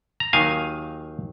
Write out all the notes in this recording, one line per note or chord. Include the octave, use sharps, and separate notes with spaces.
A#5
D#2 D#3 F#3 A#3 D#4 F5 G#5